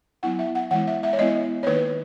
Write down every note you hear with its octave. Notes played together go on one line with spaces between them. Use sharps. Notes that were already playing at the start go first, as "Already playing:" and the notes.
F#3 B3 E4 F#5
E5
F#5
E3 G#3 B3 E4 F#5
E5
E5
C#5
G#3 B3 E4 D#5
C#5
D#3 A#3 D#4 B4